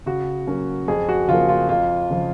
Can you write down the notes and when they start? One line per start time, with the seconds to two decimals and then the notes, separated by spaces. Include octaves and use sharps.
0.06 C#3 F#4
0.47 F#3 A#3 C#4
0.88 F2 G#4
1.09 F#4
1.28 C#3 F3 A#3 F4
1.49 F4
1.69 F2 F4
2.10 C#3 F3